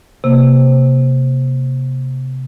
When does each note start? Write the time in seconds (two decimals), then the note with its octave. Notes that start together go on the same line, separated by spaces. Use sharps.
0.24 C3 A#3